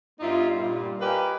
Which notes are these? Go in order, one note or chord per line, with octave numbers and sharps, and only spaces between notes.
G2 B3 D#4 F4 D5 E5
A#2 G3
G4 A#4 B4 D#5 F5 G#5